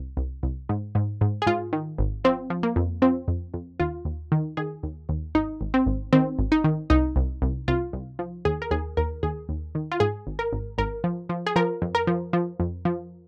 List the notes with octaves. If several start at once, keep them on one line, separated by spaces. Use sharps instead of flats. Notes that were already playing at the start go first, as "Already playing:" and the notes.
Already playing: C2
C2
C2
G#2
G#2
G#2
G#4
G#2 F4
D#3
G#1
F3 C4
F3
A#3
F2
F3 C4
F2
F2
D#2 F4
D#2
D#3
D#3 G#4
D#2
D#2
G#1 D#4
G#1
C4
G#1
D#3 C4
G#1
D#4
D#3
C2 D#4
C2
C2
C2 F4
C2
F3
D#2 G#4
A#4
D#2 G#4
D#2 A#4
D#2 G#4
D#2
D#3
F4
G#2 G#4
G#1
A#4
G#1
G#1 A#4
F3
F3
G#4
F3 A#4
F2
A#4
F3
F3
F2
F3